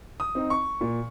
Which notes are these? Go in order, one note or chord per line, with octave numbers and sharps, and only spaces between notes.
D#6
C4 D#4
C#6
A#2